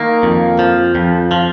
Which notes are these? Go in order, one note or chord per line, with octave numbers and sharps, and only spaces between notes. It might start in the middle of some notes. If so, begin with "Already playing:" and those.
Already playing: D#3 A#3
F2
F3
F2
F3